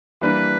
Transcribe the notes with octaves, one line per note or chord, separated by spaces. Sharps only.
E3 G3 A#3 D4 B4